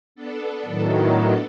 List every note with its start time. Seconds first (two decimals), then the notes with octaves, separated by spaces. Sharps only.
0.15 B3 D4 A4
0.66 A2 D#3 F#3